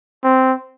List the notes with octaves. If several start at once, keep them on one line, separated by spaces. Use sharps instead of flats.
C4